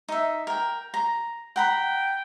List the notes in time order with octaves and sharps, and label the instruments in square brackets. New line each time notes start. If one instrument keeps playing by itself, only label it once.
[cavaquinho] D#4 E5
A#4 G5
A#5
[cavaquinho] F#5 A#5 B5 [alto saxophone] G5